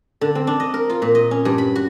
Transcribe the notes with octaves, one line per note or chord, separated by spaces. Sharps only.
D3
C4
D4
D#5
A#4
F4
A#2
D#5
C#4
G2
B5
F#4